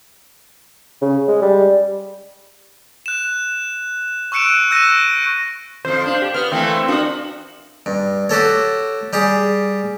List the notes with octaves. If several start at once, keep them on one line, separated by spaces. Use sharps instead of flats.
C#3
G#3
G3
F#6 E7
C#6 E6 F#6 C#7 D7 E7
E6 F#6 G6 A#6 D#7
F2 F3 C5
D4
G4
B3 F6
E3 A3 A#3 C4
D4 F4 F#4
G2
F#4 G4 A4 C#5
G3 G4 G#4